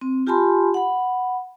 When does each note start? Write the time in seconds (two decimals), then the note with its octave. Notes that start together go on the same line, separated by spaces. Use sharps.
0.01 C4
0.27 F4 G4 G#5 A5 B5 C6
0.74 F#5 B5